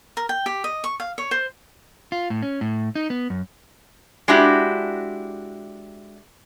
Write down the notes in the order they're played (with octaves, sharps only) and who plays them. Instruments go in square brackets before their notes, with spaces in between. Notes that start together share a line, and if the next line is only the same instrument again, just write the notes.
[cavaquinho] A#4
G5
G4
D#5
C#6
F5
C#5
C5
[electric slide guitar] F4
A2
C#4
A2
D#4
B3
F#2
[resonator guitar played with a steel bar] G#3 D4 E4 F#4 G4